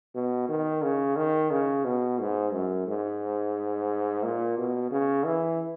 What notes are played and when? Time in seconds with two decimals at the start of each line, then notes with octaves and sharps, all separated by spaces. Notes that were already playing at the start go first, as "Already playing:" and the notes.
0.15 B2
0.49 D#3
0.83 C#3
1.16 D#3
1.51 C#3
1.85 B2
2.20 G#2
2.53 F#2
2.87 G#2
4.24 A#2
4.58 B2
4.92 C#3
5.25 E3